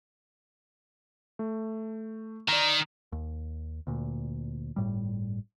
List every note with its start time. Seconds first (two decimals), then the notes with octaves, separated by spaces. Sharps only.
1.39 A3
2.48 D#3 D5 A#5
3.12 D#2
3.87 D2 A#2
4.76 G1 A2 G3